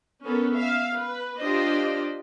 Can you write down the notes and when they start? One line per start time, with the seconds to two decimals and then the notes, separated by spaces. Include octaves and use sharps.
0.24 B3 C#4 A4 A#4
0.55 E5 F5
0.95 B4
1.40 D4 F4 G4 C5 D5 D#5